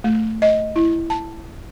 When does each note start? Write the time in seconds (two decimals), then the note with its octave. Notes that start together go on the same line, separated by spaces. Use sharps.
0.04 A3
0.42 D#5
0.76 E4
1.10 A5